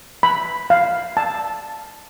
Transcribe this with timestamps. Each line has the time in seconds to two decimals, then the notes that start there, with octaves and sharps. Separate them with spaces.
0.23 B5
0.70 F5
1.17 A5